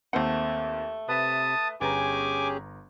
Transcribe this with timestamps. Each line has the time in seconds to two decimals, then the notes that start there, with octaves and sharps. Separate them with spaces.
0.13 D#2 A3 A#3 C4 C5 F#5
1.09 C3 B4 E5 A5 D#6
1.81 G1 B3 C#4 G4 G#4 G#5 A#5 D6